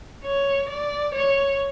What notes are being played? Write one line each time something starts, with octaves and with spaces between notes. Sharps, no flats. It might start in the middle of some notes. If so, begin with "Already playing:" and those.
C#5
D5
C#5